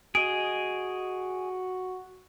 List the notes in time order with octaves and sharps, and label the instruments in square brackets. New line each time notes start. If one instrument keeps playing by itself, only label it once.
[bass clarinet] F#4 [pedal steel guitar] G#4 D#5 [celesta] D7